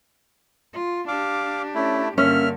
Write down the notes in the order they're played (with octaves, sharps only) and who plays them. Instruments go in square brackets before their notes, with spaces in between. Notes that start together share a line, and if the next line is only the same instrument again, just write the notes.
[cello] F4
[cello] D4 G4 [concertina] F5 D6
[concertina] A3 E4 [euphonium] C#4
[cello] G2 D3 [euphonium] A#3 [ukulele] C#4 [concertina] E5 F6